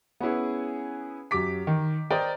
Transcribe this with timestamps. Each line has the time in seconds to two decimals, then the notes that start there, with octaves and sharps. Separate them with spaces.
0.21 B3 C#4 E4 G#4
1.31 F#2 F#3 G4 D6 B6
1.67 D#3
2.10 A#4 C5 D5 D#5 G5